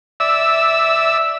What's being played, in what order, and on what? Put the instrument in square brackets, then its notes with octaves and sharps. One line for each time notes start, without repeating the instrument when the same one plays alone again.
[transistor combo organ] D5 E5 E6